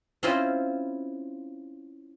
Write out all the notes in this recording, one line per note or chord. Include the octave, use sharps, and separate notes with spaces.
C4 C#4 E4 F4 D#5 E5